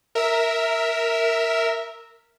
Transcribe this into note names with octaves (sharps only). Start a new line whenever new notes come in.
A#4 E5